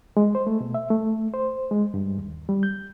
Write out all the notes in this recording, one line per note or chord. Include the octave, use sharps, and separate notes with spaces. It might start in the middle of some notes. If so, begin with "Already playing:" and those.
G#3
C5
A3
B2
E5
A3
C5
G#3
G2
D#2
G3
G6